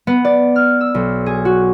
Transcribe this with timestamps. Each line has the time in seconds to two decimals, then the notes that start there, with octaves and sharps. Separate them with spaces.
0.07 B3
0.25 D5
0.56 F6
0.81 E6
0.95 B1
1.26 G#4
1.45 F#4